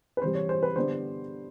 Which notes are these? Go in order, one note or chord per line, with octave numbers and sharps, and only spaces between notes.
B4
C3 E3 G3 C5
C#5
C5
B4
D3 G3 B3 D4 C5